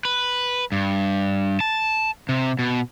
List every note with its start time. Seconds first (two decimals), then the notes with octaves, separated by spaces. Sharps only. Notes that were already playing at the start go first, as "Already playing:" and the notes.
0.05 B4
0.72 G2
1.61 A5
2.29 C3
2.59 B2